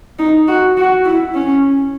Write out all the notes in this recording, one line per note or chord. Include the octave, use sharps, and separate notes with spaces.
D#4
F#4
F#4
E4
C#4